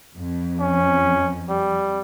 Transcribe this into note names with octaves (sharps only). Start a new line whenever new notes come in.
F2
C#4
G3